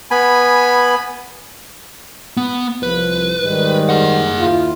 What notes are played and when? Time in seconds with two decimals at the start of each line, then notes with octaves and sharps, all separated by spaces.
0.11 B3 G#5 B5
2.37 B3
2.83 C2 F3 B4
3.42 G#2 D#3 G3
3.89 G#4 F#5
4.40 D#2 E4 F4